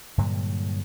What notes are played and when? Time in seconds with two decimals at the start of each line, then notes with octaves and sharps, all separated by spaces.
0.18 G2 A#2 D3 F#3